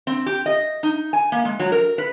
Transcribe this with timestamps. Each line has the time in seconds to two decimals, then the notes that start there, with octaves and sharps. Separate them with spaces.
0.07 C4
0.26 G4
0.46 D#5
0.83 D#4
1.13 G#5
1.32 A#3
1.45 G#3
1.60 F#3
1.72 A#4
1.98 B4